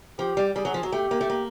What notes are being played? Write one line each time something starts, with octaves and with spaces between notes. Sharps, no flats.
F3 G4
G3
G3 G#4
F#3
F3
F#3
A3 G4
A#3
A3
A#3